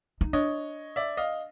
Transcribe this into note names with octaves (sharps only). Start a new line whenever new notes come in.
D#4
D4 C#5 D#5
D5 E5
D#5 F5